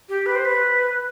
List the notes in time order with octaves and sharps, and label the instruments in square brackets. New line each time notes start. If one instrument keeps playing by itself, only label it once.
[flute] G4
B4
C5
B4